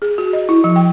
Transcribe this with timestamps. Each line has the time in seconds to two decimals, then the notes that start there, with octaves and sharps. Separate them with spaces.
0.02 G#4
0.18 F#4
0.33 D#5
0.49 E4
0.64 F3
0.76 G5